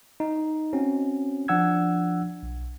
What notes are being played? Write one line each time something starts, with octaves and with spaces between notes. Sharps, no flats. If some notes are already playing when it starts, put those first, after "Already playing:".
D#4
C4 C#4 F#4
F3 D4 F#5 E6 G#6
B1